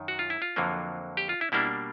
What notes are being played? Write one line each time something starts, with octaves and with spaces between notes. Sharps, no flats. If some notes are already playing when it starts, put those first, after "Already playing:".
Already playing: F#2 D#3
F#4
F4
E4
F4
F2 D3 F#3 A#3
G4
F4
E4
B2 G3 A#3 D4 E4